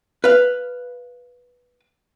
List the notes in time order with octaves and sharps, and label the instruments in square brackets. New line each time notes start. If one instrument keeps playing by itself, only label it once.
[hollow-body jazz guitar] B4 F5